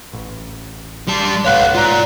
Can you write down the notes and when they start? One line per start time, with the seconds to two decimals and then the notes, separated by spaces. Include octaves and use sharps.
0.13 A1
1.08 G3 D5 A5 C6
1.45 G1 C2 A2 B4 C#5 F5 F#5 F#6
1.75 G#2 F4 D5 A#5